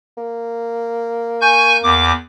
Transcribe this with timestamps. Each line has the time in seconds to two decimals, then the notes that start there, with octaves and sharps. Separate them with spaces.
0.17 A#3
1.41 G#5 C#6 G6
1.83 E2 D6